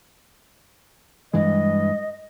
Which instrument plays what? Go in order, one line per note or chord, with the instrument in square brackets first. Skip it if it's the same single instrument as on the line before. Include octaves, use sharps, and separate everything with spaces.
[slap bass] G2 E3 G#3 [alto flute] D#5